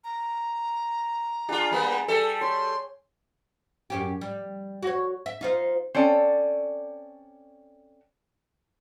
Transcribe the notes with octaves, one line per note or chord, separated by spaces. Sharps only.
A#5
D4 F4 G#4 G5
G3 A#3 B3
G3 A4
C#5 C6
F#2 C#4 G4
G3
F#4 C#5
E5
D#4 F4 C5
C4 C#4 A4 D5